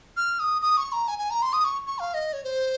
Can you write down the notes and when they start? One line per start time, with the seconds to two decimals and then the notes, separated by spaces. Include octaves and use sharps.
0.17 F6
0.40 D#6
0.62 D#6
0.77 C#6
0.92 A#5
1.08 G#5
1.19 G#5
1.30 A#5
1.42 C6
1.53 D#6
1.65 C#6
1.87 C#6
1.99 F5
2.14 D#5
2.33 C#5
2.44 C5